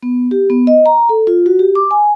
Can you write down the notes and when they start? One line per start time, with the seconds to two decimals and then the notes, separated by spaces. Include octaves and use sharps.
0.03 B3
0.31 G4
0.50 B3
0.67 D#5
0.86 A#5
1.09 A4
1.27 F4
1.46 F#4
1.59 G4
1.75 D6
1.91 G#5